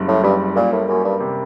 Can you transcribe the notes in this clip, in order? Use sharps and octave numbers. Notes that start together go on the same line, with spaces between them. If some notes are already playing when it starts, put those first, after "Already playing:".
Already playing: F#1 G3
A2
G2 G3
A#2 A#3
A2
F#2 A#3
G2
C3